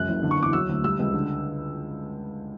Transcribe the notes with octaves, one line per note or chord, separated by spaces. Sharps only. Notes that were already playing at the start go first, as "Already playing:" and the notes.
Already playing: C#2 F#2 F#6
F#1
D3
C#6
E2 D6
F#3 E6
D2
G3 E6
C#2
D3